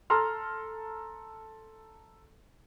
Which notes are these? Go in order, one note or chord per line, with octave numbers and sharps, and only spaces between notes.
A4 A#5 C6 F6